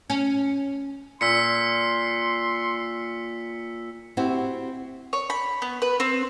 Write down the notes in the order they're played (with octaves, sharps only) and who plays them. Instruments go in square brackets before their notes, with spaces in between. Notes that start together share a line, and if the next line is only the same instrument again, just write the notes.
[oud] C#4
[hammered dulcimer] A#2 [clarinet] C6 [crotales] E6 B6 C#7
[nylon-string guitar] C4 E4 F#4 G4
[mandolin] C#5
B5
B3
B4
C4